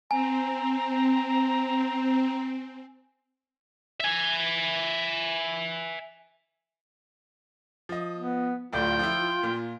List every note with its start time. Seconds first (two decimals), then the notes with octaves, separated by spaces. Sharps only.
0.11 C4 G#5 A#5
4.01 E5 G#5
7.89 F3 D#5
8.18 B3
8.73 D1 A2 F4 D5 G5
8.99 F3 E4
9.43 A#2